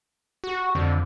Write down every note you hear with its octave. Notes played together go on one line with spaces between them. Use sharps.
F#4
F2 D3